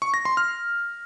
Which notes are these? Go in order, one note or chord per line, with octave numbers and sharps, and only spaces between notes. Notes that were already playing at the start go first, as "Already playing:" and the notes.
C#6
A#6
C6
F6